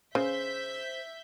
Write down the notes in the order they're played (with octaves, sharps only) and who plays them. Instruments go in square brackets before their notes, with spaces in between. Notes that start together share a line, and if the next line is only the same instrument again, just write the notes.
[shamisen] C#3 [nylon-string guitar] C5 [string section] E5 G6 B6